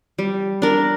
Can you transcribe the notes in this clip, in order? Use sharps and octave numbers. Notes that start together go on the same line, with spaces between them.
G3
D4 A#4